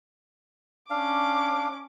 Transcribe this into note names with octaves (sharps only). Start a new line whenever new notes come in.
C#4 D4 F5 D6